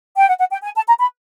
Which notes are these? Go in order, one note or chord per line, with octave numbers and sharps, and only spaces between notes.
G5
F#5
F#5
G5
G#5
A5
A#5
B5